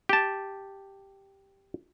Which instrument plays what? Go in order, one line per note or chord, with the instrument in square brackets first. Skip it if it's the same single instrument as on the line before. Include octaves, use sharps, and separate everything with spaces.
[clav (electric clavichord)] G4 A5